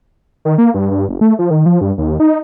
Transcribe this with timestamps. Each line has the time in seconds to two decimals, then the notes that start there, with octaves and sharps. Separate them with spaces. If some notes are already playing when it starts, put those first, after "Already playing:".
0.45 D#3
0.58 A#3
0.74 G2
0.91 G2
1.09 F#1
1.21 A3
1.39 F3
1.51 D#3
1.66 F3
1.81 G2
1.98 D#2
2.20 D#4